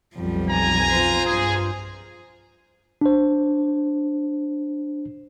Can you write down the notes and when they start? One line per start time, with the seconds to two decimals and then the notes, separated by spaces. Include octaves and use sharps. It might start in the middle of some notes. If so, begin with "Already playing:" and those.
0.15 B1 F2 F3 G3
0.49 G#5 A#5
0.88 F4 C5
1.25 G2 G#4
3.01 D4 C5